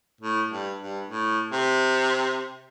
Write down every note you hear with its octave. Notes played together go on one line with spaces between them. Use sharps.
A2
G2
G2
A2
C3